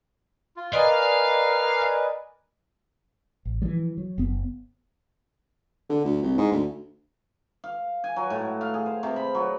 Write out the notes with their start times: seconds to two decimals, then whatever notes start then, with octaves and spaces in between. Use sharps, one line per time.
0.56 F4
0.73 A#4 B4 D5 D#5 F5 G#5
3.45 A1
3.62 E3 F3 G3
3.97 F#3
4.18 F#1 B3
5.90 D3
6.05 D2
6.23 C2
6.38 G#2
6.52 D2
7.64 F5
8.04 G#5
8.16 F#3
8.30 A2
8.61 F5
8.74 G#4
8.86 C5
9.03 C3
9.16 B5
9.35 F#3